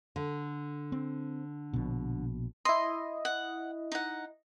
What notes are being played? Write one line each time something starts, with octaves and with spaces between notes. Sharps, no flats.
D3
C4
A#1 B2
E4 D#5 C6
F#5
D#4 F#5